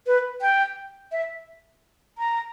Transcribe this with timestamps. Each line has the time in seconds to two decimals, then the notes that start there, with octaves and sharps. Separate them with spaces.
0.07 B4
0.41 G5
1.12 E5
2.18 A#5